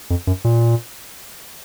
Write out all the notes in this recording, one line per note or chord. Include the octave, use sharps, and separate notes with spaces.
F2
F#2
A#2